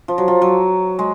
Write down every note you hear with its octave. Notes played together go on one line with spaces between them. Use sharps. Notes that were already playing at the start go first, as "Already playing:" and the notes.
F3
F#3
F3
F#3
G#3